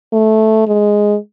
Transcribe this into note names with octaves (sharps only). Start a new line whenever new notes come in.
A3
G#3